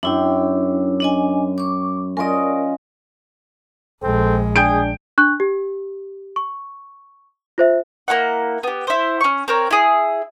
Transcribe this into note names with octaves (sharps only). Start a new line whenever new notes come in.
F#2 D4 E4 G5
D4 D#5 G#5
C#6 D6
C#4 F4 A#4 D5 D#5
A#1 G#3 C4 A4
D4 G#4 G5 G6 D7
D4 C#6 F#6
G4
C#6
F4 C5 E5
A#3 C4 E4 F#5
B3 G4
E4 C5
C#4 C#6
C4 A#4 C#5
E4 G#4